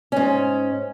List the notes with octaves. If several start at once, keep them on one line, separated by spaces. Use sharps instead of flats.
G#2 C#4